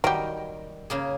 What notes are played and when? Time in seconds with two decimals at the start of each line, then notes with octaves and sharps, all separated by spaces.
0.04 D#3 F#3 G3 G4 A#4
0.90 C#3 A#3 G#4